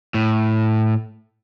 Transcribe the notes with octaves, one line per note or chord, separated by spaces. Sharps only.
A2